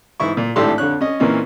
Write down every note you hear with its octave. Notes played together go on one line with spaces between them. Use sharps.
G#2 E3 E4 C#6
A#2
G#1 A2 D4 G4 A4 C6
F2 D3 C#5 F#6
C#4 D#5
A#2 E3 A#3 C4 C#4 D#4